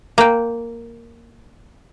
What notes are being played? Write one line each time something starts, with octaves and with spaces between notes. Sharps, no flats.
A#3 G5